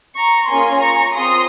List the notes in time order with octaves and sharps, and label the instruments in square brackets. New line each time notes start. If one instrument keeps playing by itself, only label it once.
[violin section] A#5 C#6
A#3 C#4 F4 G#4 G#5 C6
A#5 C#6
C4 F4 G#4 C6 D#6